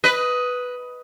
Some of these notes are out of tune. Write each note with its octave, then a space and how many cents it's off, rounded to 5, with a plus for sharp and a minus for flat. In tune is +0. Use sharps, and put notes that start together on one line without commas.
B4 +0 D#5 +10